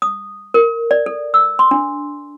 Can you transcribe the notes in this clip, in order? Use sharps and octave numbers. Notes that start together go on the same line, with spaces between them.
D#6
A#4
D5
A4
E6
C6
D4